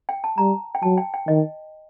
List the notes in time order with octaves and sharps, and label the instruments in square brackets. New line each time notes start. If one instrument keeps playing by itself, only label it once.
[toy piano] G5
A5
[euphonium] G3 [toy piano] A#5
[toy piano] G5
[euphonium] F#3 [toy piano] A5
[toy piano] G5
G5
[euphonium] D#3 [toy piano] D#5